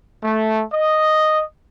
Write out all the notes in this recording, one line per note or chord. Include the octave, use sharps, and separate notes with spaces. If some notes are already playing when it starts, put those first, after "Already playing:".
A3
D#5